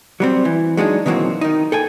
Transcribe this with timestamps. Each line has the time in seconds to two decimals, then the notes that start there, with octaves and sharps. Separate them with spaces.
0.20 F#3 G3 C4
0.45 E3
0.77 F#3 G#3 D4 D#4
1.06 B2 D#3 E3 F#3 A#3 C4
1.41 D#3 D#4
1.72 A4 G5 G#5